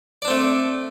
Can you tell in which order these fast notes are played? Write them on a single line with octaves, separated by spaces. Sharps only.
D5 D4 C4 A3